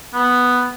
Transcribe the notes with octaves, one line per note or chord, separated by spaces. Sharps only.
B3